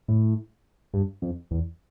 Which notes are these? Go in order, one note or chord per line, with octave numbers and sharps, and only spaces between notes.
A2
G2
F2
E2